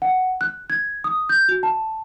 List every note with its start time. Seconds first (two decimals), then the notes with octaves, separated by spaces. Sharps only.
0.02 F#5
0.41 F#6
0.70 G#6
1.04 D#6
1.29 G6
1.49 F#4
1.63 A5